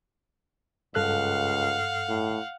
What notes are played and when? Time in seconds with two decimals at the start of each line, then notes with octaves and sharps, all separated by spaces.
0.95 C#2 G2 A4 F5 F#5 F#6
2.09 A2